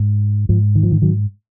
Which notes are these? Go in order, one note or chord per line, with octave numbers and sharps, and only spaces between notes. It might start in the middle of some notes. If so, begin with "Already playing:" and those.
Already playing: G#2
G#2 F3
D#3
F3
D#3
D#3 F#3